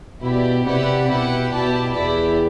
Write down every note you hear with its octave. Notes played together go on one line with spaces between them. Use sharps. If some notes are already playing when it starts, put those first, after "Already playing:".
B2 E4 G4 D5
C3 E4 G4 B4 D5 F#5
B2 E4 G4 B4 F#5
B2 E4 G4 D5 A5
E2 B3 E4 G4 D5